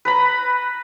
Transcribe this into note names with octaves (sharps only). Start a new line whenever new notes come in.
B4 A#5 B5